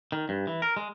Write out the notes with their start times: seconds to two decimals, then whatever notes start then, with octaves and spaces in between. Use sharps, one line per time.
0.12 D#3
0.29 G2
0.47 E3
0.62 A#4
0.77 G#3